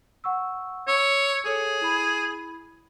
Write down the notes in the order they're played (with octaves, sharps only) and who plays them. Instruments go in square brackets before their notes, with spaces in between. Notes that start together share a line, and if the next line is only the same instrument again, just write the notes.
[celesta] F#5 C#6 E6
[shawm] C#5 [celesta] E6
[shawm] G#4 [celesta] A4 C#5
[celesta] E4 B5